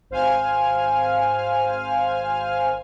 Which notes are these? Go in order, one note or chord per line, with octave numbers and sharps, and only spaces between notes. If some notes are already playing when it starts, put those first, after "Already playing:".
G#1 C5 F5 G#5 F6